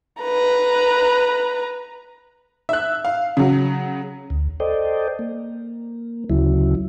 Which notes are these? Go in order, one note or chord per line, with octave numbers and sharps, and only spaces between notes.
B4 A#5
E5 F#6
F5
C#3 F#3
D2
A4 C5 D5 D#5 G5
A#3
D2 C#3 F#3 E4